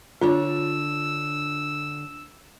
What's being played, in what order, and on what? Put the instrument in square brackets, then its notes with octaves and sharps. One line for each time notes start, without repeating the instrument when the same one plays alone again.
[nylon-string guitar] D3 D4 C#5 [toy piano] F4 [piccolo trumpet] E6